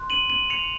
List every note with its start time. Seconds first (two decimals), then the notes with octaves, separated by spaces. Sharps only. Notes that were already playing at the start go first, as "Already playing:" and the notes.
Already playing: C6 F#6
0.10 D#7 F#7
0.30 D#7 F#7
0.50 C#7 F7